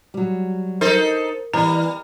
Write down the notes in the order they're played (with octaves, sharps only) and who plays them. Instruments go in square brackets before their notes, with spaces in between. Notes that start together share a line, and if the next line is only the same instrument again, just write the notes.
[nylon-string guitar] F#3 G3
[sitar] D#4 A4 C5 [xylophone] A#4
[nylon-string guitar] E3 B3 [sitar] G3 [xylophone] A#5